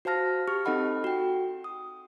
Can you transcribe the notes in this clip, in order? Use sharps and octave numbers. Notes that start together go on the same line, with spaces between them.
F#4 C5 F5 A5 F6 A#6
G4 C#6 F6
C4 D#4 A4 D#5 F#5 B5
F#4 G5
D#6